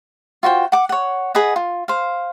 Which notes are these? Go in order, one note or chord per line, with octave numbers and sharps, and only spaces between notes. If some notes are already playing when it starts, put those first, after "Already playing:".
F4 F#4 C5 G5
F#5 D6
C#5 F#5
G#4 B4 D#5 F#5
F4
C5 F5